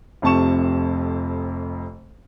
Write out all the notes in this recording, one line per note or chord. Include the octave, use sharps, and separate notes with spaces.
F1 F2 C3 A5 C#6 E7